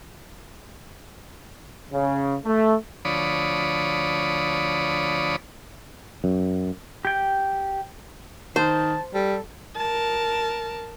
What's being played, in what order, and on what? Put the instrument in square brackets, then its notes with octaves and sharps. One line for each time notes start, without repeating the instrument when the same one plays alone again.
[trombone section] C#3
A3
[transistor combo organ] D2 F3 C#5 D5 B5 D#6
[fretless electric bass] F#2
[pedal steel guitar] G4 G5
[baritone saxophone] D#3 [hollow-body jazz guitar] C5 [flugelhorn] A5
[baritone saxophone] G3 [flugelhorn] A4
[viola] A#4 A5